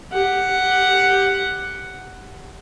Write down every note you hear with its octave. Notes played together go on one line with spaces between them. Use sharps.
G4 F#5